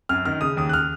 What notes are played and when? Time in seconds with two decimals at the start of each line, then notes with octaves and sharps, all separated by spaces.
0.09 F#2 F6
0.25 D#3 F6
0.41 C#3 D#6
0.57 D#2 D#6
0.69 F#6
0.73 F6